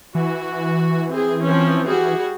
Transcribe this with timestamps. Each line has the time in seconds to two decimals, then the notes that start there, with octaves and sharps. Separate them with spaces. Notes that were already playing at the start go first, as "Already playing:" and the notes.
0.15 E3 F#4
1.11 C4 G#4
1.44 F3 C4 C#4
1.86 G3 F#4 G#4